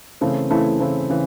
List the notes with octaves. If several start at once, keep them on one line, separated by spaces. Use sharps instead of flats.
C#3 E3 A3 C4 E4
C#3 E3 A3 C4 E4
C#3 E3 A3 C4 E4
C#3 E3